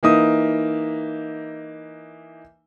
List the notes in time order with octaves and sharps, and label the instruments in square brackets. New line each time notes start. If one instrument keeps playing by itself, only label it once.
[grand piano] E3 A#3 D#4 E5 D#6